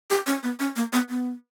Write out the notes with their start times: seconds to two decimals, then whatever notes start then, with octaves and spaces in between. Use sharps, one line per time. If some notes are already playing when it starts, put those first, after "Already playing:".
0.10 G4
0.27 C#4
0.43 B3
0.60 C#4
0.76 A#3
0.93 B3
1.09 B3